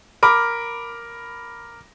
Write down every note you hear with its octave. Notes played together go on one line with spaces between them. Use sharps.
A#4 B5 D6